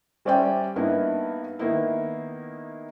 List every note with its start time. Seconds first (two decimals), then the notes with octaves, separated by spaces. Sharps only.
0.25 G3 C#4 C5 D5 E5 G5
0.76 G2 A#3 B3 D#4 E4
1.59 D#3 A#3 B3 D#4 E4